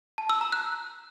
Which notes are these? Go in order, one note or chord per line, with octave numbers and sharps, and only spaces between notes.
A5
E6
A#5
F#6